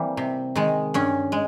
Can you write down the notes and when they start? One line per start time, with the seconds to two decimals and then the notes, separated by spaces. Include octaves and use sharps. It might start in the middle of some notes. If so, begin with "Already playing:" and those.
Already playing: E3 G3 A#3 C4
0.17 C3
0.55 D#3 G#3
0.94 G2 C#4
1.32 G#3